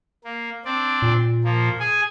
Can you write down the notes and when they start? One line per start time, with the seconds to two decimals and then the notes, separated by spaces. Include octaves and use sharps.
0.24 A#3
0.65 C4 D4 D5
1.02 A#2
1.44 F3 A#3
1.80 G#4 G#5